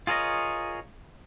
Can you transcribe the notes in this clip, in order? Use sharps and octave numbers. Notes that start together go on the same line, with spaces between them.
F4 G#4 A#4 C#5 D#5